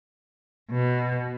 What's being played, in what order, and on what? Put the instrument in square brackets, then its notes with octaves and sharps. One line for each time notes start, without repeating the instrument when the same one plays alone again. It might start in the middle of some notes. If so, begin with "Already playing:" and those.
[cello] B2